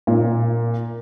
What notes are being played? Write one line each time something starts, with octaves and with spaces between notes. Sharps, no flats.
A#2